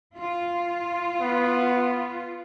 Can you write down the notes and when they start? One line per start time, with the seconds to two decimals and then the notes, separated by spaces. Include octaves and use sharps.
0.18 F4
1.20 B3